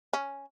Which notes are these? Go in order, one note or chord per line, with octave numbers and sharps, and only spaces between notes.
C#4